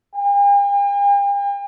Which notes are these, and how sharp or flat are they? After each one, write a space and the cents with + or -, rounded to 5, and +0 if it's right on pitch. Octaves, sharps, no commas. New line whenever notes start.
G5 +45